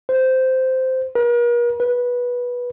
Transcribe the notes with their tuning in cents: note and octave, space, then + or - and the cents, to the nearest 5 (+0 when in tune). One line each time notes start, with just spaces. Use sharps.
C5 -10
A#4 +45
B4 -15